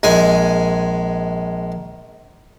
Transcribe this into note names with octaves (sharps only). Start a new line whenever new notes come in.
A#1 G#3 G#5